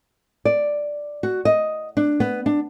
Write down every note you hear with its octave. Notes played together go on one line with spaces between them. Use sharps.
D5
F#4
D#5
D4
B3
D4